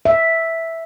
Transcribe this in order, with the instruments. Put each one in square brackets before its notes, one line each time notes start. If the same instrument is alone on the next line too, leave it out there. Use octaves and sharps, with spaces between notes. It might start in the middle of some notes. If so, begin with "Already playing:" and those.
[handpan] E5